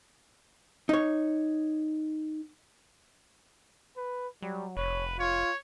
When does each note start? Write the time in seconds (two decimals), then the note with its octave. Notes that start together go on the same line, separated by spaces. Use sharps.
0.89 D#4 C#5
3.97 B4
4.42 F#3 G3
4.77 F1 B4 C#5
5.19 F4 C#5